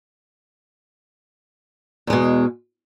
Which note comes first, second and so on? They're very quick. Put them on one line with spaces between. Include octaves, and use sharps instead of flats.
E2 G#3 B2